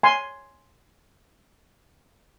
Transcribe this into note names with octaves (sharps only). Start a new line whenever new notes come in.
G#5 C6